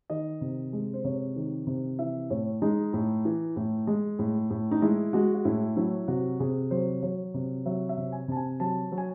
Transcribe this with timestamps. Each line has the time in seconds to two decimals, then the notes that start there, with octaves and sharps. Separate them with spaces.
0.10 D#3 D#5
0.41 C3
0.73 G#3
0.94 C5
1.04 C3 C#5
1.36 D#3
1.67 C3
1.99 E3 E5
2.30 A2 C#5
2.62 G#3 D#4
2.93 A2
3.25 E3
3.56 A2
3.87 G#3
4.19 A2
4.50 A2
4.71 D#4
4.82 G#3 E4
5.13 G#3 F#4
5.34 F#4
5.45 A2 E4
5.77 F#3 E4
6.08 C3 F#4
6.40 C3 G#4
6.71 F#3 C5
7.03 F#3 C#5
7.34 C3
7.66 F#3 E5
7.89 E5
7.97 C3
8.12 G#5
8.28 C3 A5
8.37 G#5
8.60 F#3 A5
8.92 F#3
8.98 G#5